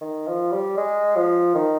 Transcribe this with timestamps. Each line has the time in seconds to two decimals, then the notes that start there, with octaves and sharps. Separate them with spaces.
0.01 D#3
0.27 F3
0.52 G3
0.77 G#3
1.16 F3
1.55 D#3